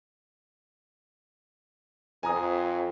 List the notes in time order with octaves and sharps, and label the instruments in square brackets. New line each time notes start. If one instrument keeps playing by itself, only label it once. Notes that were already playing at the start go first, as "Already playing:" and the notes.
[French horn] F2 [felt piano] G#5 A#5 D#6